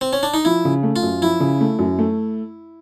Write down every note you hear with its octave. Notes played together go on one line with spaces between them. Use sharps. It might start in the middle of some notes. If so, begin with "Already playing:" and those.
C4
C#4
D4
D#4
F3 E4
C#3
A3
F4
F#2
F3 E4
C#3
A3
F#2
A3